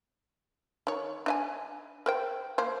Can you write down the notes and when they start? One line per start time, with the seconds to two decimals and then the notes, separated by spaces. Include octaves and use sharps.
0.87 D#3 C#5
1.26 D4 D#5 G#5
2.06 A#4 C5 G5
2.58 A#3 C5